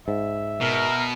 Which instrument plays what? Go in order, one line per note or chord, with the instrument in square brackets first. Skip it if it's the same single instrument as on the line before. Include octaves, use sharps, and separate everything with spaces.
[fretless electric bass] G#2 [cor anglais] E5
[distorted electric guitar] B2 [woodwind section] A#4